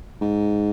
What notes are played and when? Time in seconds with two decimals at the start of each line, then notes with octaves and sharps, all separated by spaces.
0.21 G#2